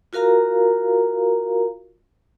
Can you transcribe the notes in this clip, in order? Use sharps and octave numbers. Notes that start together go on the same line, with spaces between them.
F4 F#4 A#4 F5 A#5